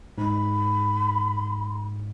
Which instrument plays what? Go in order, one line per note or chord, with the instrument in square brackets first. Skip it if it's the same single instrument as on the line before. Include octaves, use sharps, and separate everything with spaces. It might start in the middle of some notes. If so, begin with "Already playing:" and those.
[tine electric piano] G#2 [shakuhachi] B5